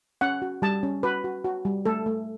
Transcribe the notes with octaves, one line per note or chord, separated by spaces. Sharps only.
C#4 F#5
F#4
G3 A5
C#4
F#4 B4
F#4
F#4
G3
A3 A4
A3